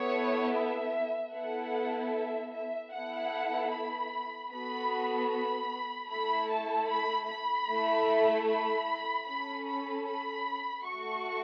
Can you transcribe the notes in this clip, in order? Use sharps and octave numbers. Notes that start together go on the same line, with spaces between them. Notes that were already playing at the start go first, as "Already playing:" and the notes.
Already playing: B3 E4 A4 C#5
E5
B3 E4 A4 F#5
E5
E5
B3 E4 A4 F#5
B5
B3 F#4 A4 B5
B5
A3 E4 A4 B5
A5
B5
B5
A3 E4 A4
B5
C#4 A4 B5
B5
B5
A3 F#4 A4 C#6